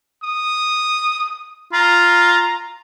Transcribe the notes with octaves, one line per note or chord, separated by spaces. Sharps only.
D#6
F4 A#5